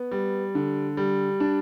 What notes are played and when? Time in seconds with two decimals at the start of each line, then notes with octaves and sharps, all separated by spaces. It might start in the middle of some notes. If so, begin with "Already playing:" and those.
Already playing: B3
0.12 G3
0.55 D3
0.97 G3
1.40 D4